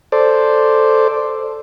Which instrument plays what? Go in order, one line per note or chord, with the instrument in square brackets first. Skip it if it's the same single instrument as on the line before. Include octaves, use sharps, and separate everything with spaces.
[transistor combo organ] A4 C5 D5